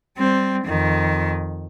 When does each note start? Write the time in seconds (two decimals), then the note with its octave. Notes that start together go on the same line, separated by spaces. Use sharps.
0.18 G3 C4
0.64 F2 D#3